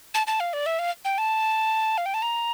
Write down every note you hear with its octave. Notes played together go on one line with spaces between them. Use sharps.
A5
A5
F5
D5
E5
F5
G5
A5
F5
G5
A5
A#5